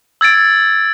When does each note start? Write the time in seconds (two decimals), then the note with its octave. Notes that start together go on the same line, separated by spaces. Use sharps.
0.21 E6 G#6 A6 D7